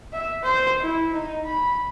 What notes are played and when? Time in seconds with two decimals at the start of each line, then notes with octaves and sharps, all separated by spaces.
0.13 E5
0.43 C5
0.81 E4
1.13 D#4
1.45 B5